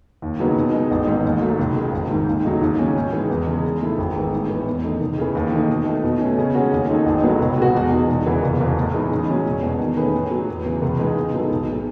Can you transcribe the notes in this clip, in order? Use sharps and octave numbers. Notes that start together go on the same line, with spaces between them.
D#2
C#3 F#3 B3 D#4
B2
G#3 D#4
A1
G#2 D#3
D#2
D#3 F#3 A3
C#2
C#3 G#3
G#1
G#2 D#3
D#2
C#3 F#3 A3 D#4
D#2
C#3 F#3 C#4
G#2
E3 G#3
E2
C#3 G#3
D#3
A3 E4 A4
G#1
G#2 D#3 G#3 B3
A2
E3 B3
E2
D#3 A3 D#4
C#2
C#3 E3
D#2
D#3 A3 D#4
B2
A3 D#4
B2
A3 C#4
C#3
G#3 C#4 F#4
D#2
D#3 G#3 D#4 A4
A1
A2 F#3 B3
C#2
B2 G#3 B3 F#4
E2
B2 G#3 D#4
E1
E2 C#3 E3 B3
F#1
E2 B2
A2
E3 G#3 B3 D#4
C#3
F#3 C#4 G#4
E1
E2 B2
D#3
A3 C#4 G#4 B4
A2
F#3 B3
E2
C#3 E3
C#2
C#3 G#3 B3 D#4
G#2
F#3 B3 D#4 A4
B1
A2 G#3